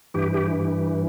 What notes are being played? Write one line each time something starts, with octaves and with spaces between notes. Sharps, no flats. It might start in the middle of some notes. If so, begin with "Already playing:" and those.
G2 E3 G4
G4